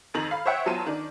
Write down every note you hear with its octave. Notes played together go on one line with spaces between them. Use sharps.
F2 D#3 A#5 F#7
F5 B5
C5 C#5 E5 F#5 G5
E2 F#3 F4 A5 C6 D#7
D#3 D4